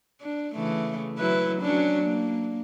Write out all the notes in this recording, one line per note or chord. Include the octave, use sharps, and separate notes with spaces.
D4
C#3 E3 A3
F#3 E4 B4
F#3 C#4 D4
A#3